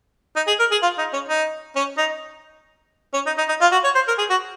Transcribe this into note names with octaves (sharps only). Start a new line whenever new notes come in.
D#4
G#4
A#4
G#4
F4
D#4
C#4
D#4
C#4
D#4
C#4
D#4
D#4
D#4
F4
F#4
C#5
C5
A#4
G#4
F#4